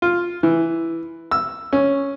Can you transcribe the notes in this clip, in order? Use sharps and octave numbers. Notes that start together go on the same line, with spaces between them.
F4
E3
E6
C#4